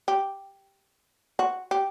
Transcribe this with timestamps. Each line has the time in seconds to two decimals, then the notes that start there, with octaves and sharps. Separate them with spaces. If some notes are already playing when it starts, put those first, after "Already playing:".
0.08 G4
1.39 F#4
1.71 G4